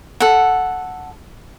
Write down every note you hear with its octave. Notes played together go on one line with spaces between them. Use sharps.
A4 F#5